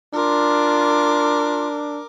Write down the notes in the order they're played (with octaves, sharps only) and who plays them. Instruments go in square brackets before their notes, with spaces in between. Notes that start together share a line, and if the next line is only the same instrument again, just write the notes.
[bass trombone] D4 [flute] F4 [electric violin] A#4 D6